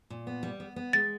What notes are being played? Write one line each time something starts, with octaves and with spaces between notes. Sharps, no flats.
A#2
B3
G3
B3
B3
G#3 A6